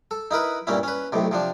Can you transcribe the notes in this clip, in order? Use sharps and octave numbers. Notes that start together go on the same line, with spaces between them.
A4
D#4 E4 A#4 B4
G2 A#2 C#4 E4
C#4 B4
B1 A2 C3
C3 F3 D4